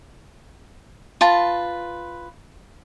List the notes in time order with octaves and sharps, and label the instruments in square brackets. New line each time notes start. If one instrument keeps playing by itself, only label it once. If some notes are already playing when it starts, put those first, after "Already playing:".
[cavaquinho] F4 B4 A5